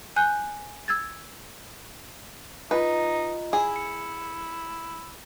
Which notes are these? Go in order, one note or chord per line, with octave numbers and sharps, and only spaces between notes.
G#5 F#6 G6
E6 G#6 A6
D#4 F4 B4 D#5 A#5
E4 G#4
C#7